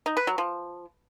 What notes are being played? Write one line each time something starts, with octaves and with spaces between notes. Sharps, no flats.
D#4
B4
F#3
F3